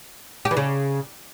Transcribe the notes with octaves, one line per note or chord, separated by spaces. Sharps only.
G4
E3
C#3